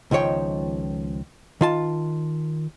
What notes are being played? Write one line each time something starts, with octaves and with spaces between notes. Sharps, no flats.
C#2 D#3 F3 C#5 G5
D#3 F4 A5